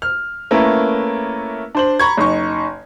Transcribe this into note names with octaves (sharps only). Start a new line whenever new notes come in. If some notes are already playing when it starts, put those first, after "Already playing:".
F6
A3 A#3 C#4 E4 A#4 B4
D4 C5 F#7
A#5 B5 C#6 G#6
F#1 D#4 C#6